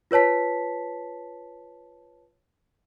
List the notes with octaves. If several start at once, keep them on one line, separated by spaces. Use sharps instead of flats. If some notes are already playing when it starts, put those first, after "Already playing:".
F4 B4 C#5 A5 B6